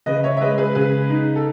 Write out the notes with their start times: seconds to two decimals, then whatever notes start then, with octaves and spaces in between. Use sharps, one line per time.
0.06 C#3 B4 D#5
0.23 C#5 E5
0.37 E5
0.41 G#3 B4 D#5
0.58 G#4 B4
0.75 C#3 G#4 B4
1.10 D#4
1.36 A4